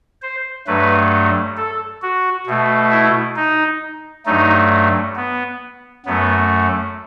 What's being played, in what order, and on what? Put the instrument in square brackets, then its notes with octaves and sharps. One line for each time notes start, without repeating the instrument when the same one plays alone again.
[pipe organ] C5
G2 F#3 A3 B4
A4
F#4
B2 A3
E4
D#4
G2 F#3 A3 D#4
B3
F#2 F#3 A3 B3